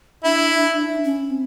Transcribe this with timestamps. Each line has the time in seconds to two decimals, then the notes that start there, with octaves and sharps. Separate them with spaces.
0.24 D4 E4
1.04 C#4
1.30 C4